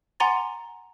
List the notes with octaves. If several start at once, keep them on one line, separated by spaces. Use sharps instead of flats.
F#5 G#5 A#5 C6 D6 A6